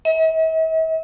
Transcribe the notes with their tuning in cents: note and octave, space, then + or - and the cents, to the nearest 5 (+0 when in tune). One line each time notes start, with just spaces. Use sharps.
E5 -45